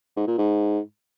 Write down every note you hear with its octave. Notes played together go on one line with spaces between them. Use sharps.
G#2
A#2
G#2